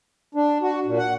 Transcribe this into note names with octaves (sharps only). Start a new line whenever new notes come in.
D4
F#4
A#2
F#5